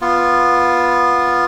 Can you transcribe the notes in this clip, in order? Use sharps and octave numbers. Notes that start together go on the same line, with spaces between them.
B3 F4